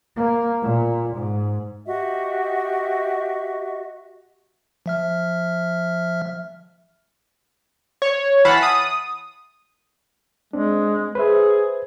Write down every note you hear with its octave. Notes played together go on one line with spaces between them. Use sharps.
A#3
A#2
G#2
F#4 G4 D#5 E5
F3 E5 F6
C#5
E3 F5 F#5 A5 B5
D#6
G#3 C4 D4
G#4 B4 C5 E5